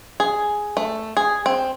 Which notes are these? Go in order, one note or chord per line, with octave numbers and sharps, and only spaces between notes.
G#4
A3
G#4
C4